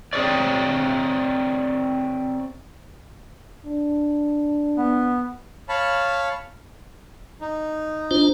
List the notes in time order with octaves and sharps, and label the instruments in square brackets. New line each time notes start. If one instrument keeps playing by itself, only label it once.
[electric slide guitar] C4 G#4 A4 C#5 D5
[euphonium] D4
[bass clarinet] B3
[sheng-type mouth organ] C#5 F5 A5 B5
[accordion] D#4
[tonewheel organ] D4 F4 C5